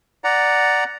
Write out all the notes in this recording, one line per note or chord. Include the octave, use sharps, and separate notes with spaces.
D5 F#5 A#5